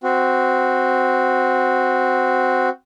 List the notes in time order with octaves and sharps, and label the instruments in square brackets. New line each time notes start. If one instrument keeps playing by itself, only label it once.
[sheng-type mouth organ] C4 F#4